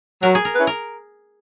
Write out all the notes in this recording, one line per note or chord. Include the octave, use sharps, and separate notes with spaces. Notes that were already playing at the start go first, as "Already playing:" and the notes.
F#3 A#4
G#4
A#4
C#4 E4 B4
A#4